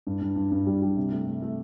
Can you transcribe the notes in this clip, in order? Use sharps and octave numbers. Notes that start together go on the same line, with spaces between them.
G2
G2
G2
G2
G3
G3
C3
A3
A3
A3